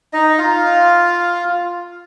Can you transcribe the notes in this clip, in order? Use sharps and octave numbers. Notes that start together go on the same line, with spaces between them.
D#4 D#5
F4 F5